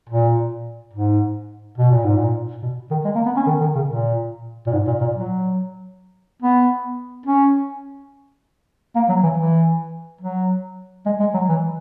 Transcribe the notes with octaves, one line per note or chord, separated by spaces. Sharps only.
A#2
G#2
B2
A#2
G#2
A#2
B2
D#3
G#3
A#3
B3
C#4
D#3
D#3
C#3
A#2
A#2
G#2
A#2
A#2
F#3
B3
C#4
A#3
F#3
E3
E3
F#3
G#3
G#3
F#3
E3